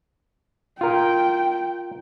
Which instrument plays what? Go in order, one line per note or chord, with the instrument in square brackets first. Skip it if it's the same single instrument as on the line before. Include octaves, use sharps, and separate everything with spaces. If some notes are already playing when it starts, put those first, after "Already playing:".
[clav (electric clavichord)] F4 A#4 [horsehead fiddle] G5